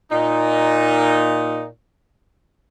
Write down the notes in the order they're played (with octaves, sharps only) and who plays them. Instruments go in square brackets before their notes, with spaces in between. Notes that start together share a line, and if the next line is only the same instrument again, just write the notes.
[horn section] A#2 D#4